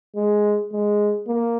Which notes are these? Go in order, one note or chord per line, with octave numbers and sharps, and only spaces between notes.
G#3
G#3
A#3